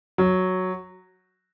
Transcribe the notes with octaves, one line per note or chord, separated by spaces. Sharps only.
F#3